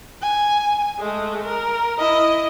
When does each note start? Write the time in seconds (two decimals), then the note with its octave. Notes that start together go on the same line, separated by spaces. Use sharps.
0.22 G#5
0.98 G#3 A3
1.44 A#4
1.98 E4 D#5